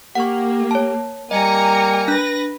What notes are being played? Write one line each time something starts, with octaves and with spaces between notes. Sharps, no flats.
A#3 G4 F#5 C#6
C#5 A5
G3 A#3 D#5 G#5 A#5 C#7
D4 B4 F#6 A#6